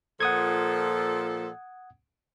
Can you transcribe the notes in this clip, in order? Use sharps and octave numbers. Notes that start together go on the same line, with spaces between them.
A#2 F3 A4 F#5 D#6 G#6